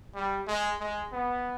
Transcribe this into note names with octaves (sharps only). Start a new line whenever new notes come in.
G3
G#3
G#3
B3